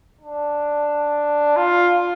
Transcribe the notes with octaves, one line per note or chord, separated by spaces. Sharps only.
D4
F4